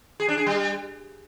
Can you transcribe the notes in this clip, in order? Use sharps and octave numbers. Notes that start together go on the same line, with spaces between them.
G#4
D4
G#4
G3